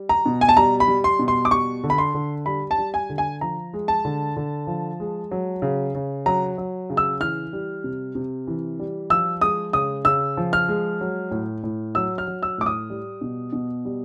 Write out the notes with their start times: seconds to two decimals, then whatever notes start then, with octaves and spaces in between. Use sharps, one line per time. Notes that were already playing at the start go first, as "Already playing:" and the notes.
Already playing: G3
0.09 A#5
0.26 B2
0.41 G#5
0.49 A5
0.57 G3 A#5
0.80 B5
0.88 G3
1.04 C6
1.19 B2
1.28 C6
1.45 D6
1.51 G3 C#6
1.84 D3
1.90 B5
1.98 C6
2.14 D3
2.46 G3 B5
2.71 A5
2.78 G3
2.94 G#5
3.09 D3
3.18 G#5
3.41 F3 A#5
3.73 G#3
3.88 A5
4.05 D3
4.37 D3
4.67 F3
5.00 G#3
5.31 F#3
5.62 C#3
5.95 C#3
6.26 F#3 A#5
6.58 F#3
6.90 C#3
6.97 E6
7.20 E3 F6
7.53 G3
7.84 C3
8.15 C3
8.47 E3
8.79 G3
9.10 F3 E6
9.41 G#3 D#6
9.73 C#3 D#6
10.05 C#3 E6
10.37 F3
10.53 F6
10.68 G#3
11.01 F#3
11.31 A2
11.63 A2
11.95 F#3 E6
12.18 F6
12.27 F#3
12.43 E6
12.58 A2 D6
12.66 D#6
12.90 G3
13.21 B2
13.53 B2
13.85 G3